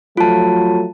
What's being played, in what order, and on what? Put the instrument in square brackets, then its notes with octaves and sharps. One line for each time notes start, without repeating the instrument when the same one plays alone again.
[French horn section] F3 F#3 A3 [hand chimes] F4 A5